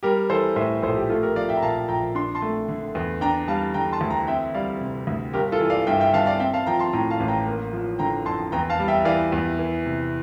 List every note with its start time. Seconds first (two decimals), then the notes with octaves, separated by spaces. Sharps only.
0.03 G3 G4 A#4
0.30 E3 A4 C5
0.56 A2 C5 E5
0.82 A#1 A4 C5
0.96 G4
1.09 A3 F4 A4
1.22 G4 A#4
1.36 F3 D5 F5
1.49 E5 G5
1.57 A#5
1.62 A#2 F5 A5
1.88 A#1 G5 A#5
2.15 D4 C6
2.35 A5 C6
2.42 A3
2.68 D3
2.95 E2
3.21 D4 G5 A#5
3.48 G3 F5 A5
3.74 D3 G5 A#5
3.92 A5 C6
4.01 D2
4.10 G5 A#5
4.27 C4 E5 G5
4.54 G3 D5 F5
4.81 C3
5.07 D2
5.33 G1 G4 A#4
5.52 F4 A4
5.61 E3
5.70 D5 F5
5.87 G2 E5 G5
6.00 E5 G5
6.14 G1 F5 A5
6.26 D5 F5
6.39 C4 E5 G5
6.54 F5 A5
6.66 F3 G5 A#5
6.79 A5 C6
6.93 A2 G5 A#5
7.10 F5 A5
7.20 A1
7.28 G5 A#5
7.46 A#3
7.73 F3
7.99 D3 G5 A#5
8.26 F2 A5 C6
8.52 E2 G5 A#5
8.70 F5 A5
8.79 G3
8.88 E5 G5
9.05 E3 D5 F5
9.32 E2
9.59 E3
9.86 C3